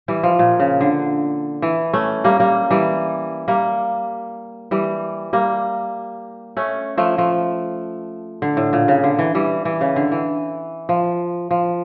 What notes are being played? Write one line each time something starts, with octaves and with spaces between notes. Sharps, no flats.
E3 G3
F3
A#2
C#3
D3
E3
A3 C#4
G3 A#3
G3 A#3
E3 G3
G3 A#3
E3 G3
G3 A#3
A3 C#4
F3 A3
F3 A3
D3
A2
A#2
C#3
D3
E3
E3 G3
E3
C#3
D3
E3
F3
F3